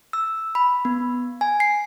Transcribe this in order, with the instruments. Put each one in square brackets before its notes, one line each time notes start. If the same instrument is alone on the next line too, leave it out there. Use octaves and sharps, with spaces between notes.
[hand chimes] E6
B5
B3
G#5
C7